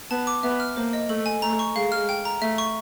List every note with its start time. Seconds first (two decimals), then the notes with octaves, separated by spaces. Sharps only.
0.11 B3 A5
0.27 D6
0.43 B3 E5
0.60 F6
0.76 A#3 C5
0.93 D#5
1.09 A3 A4
1.26 G#5
1.42 A3 A#5
1.59 C#6
1.76 G#3 F5
1.92 F6
2.09 G5
2.25 A#5
2.42 A3 E5
2.58 C#6